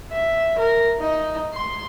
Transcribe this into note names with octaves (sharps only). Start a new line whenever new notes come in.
E5
A#4
D#4
C6